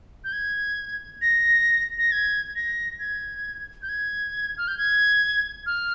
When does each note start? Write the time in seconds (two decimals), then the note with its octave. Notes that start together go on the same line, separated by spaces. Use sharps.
0.24 G6
0.33 G#6
1.22 A#6
1.99 A#6
2.12 G#6
2.56 A#6
2.99 G#6
3.83 G6
3.89 G#6
4.58 F6
4.68 G6
4.78 G#6
5.66 F6